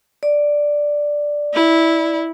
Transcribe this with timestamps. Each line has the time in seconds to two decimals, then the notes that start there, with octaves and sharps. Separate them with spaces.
0.23 D5
1.54 E4